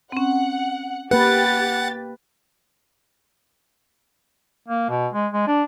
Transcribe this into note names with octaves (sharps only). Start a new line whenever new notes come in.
C4 C#4 F#5
A#3 G4 B4 F#5 A6
A#3
B2
G#3
G#3
D4